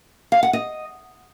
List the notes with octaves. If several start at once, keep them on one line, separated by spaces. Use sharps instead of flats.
F5
F#5
D#5